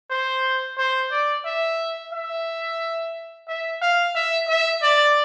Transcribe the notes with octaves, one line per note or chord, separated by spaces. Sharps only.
C5
C5
D5
E5
E5
E5
F5
E5
E5
D5